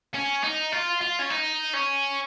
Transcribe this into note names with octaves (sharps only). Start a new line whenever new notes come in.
C#4
D#4
F4
F4
C#4
D#4
C#4